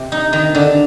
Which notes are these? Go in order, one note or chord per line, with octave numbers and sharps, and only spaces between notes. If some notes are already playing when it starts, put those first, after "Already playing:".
Already playing: C3
D#4
D#3
D3